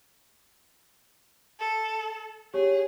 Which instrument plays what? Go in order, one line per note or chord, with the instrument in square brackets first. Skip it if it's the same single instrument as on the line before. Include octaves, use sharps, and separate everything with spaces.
[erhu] A4
[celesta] G4 C#5 [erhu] G#4